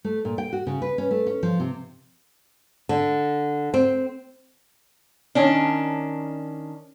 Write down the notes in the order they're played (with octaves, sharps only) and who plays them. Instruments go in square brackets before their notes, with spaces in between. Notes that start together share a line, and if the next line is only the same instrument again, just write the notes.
[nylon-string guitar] A3
A#2
G5
F#4
C#3
B4
C#4
A3
C#4
F3
C3
D3
C4
[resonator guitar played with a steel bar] D#3 C#4 D4